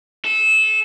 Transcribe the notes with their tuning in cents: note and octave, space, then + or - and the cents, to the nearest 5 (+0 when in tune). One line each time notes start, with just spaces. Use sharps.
A4 -20